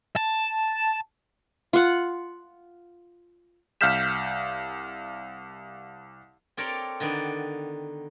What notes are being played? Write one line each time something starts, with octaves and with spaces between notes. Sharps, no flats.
A5
F4 F#5
C2 F5 F6 G6 B6 E7
C4 G4 A4 A#4 C#5 D5
D3 D#3 B3 D5